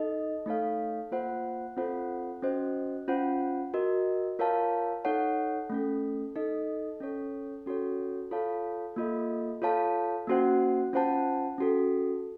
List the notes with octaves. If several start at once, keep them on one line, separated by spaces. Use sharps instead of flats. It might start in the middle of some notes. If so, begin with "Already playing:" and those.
Already playing: D#4 A4 D#5
A3 D#4 A4 C#5 F5
A#3 F4 C5 F#5
C4 F4 A4 C5 F#5
C#4 F#4 C5 D#5
C#4 F4 C5 F#5
F#4 A#4 D#5
F4 A#4 C#5 F5 A5
D#4 A4 C#5 F#5
A3 C#4 A4
D#4 A4 D#5
C#4 A4 C#5
C#4 F#4 A4 C#5
F4 A4 C#5 F5 A5
A#3 F4 A4 D#5
F4 A4 C#5 F5 A5
A#3 C#4 F#4 C5 F#5
C#4 F4 C5 F#5 A5
C#4 F#4 A4